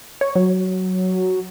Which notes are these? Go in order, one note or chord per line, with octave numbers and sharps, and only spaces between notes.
C#5
F#3